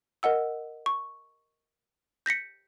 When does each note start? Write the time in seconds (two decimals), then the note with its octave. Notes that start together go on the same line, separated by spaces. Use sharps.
0.23 A#4 D#5 F#5 E6
0.86 C#6
2.26 G6 A#6 B6 C#7